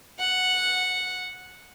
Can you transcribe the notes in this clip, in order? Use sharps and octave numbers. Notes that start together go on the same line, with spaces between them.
F#5